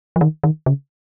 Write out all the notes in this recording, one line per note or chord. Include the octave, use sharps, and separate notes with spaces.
F3
D#3
D#3
C#3